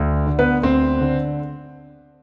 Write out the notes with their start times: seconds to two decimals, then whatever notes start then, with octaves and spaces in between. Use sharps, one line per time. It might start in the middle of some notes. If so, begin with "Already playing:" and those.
Already playing: D2
0.27 D3
0.39 B3 B4
0.63 D2 C4 C5
1.01 D3